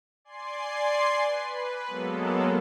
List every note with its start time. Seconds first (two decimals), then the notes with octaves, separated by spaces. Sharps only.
0.25 D5 G#5 C6 C7
1.18 B4
1.87 F#3 G#3 A#3 B3 A4